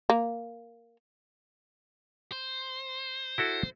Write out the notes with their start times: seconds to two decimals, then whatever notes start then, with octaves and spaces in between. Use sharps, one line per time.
0.10 A#3
2.32 C5
3.38 E4 F#4 A4